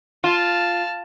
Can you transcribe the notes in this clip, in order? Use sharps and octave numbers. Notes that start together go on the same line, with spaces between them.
F4 A5 F6